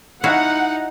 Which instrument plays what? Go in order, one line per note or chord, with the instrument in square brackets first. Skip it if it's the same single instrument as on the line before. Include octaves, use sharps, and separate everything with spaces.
[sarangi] D#4 [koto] E4 F#4 F5 [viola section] F#5